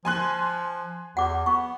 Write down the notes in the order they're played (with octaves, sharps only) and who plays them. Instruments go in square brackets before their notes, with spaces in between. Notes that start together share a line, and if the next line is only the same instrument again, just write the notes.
[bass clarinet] F3 [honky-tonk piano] G#5 C6 F#6
[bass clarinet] E2 [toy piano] F#5 D6
[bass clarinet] B3 [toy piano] C#6